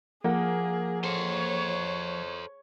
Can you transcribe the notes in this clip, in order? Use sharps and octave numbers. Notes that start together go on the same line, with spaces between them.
F3 A#3 G#4 F#5
A4 C5 C#5